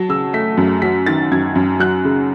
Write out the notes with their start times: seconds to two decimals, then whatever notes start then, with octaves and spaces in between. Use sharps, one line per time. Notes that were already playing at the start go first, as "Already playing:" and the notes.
Already playing: F#3 A5
0.09 C#3 E6
0.33 A3 B6
0.57 F#2
0.82 F#3 B6
1.06 D#3 A6
1.32 F#2 G#6
1.56 F#2
1.80 F#3 F#6
2.05 C#3